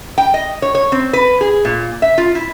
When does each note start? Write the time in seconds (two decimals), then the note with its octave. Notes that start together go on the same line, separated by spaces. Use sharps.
0.18 G5
0.34 D#5
0.62 C#5
0.75 C#5
0.92 C4
1.13 B4
1.41 G#4
1.65 A#2
2.02 E5
2.18 F4
2.35 E4